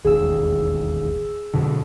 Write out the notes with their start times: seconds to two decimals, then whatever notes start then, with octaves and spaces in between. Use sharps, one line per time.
0.05 E1 A1 D#2 G#4 E6
1.54 F2 B2 D3